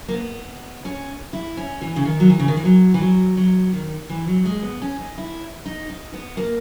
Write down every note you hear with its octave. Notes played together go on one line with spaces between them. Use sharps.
A#3
B3
C#4
E4
C#4
E3
C#3
D#3
F#3
E3
C#3
D#3
E3
F#3
E3
F#3
F#3
D#3
E3
F#3
G#3
B3
C#4
D#4
E4
D#4
D#4
B3
A#3